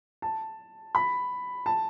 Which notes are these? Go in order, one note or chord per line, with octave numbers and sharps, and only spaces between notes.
A5
B5
A5